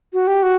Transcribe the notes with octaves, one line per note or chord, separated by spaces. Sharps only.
F#4
G4
F#4